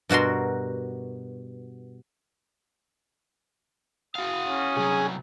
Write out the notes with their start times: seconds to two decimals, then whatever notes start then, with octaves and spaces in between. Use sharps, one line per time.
0.09 G2 B2 F#4 A#4 C6
4.15 F#4 F5 D#6
4.47 C#4
4.76 C2 F#3 G#4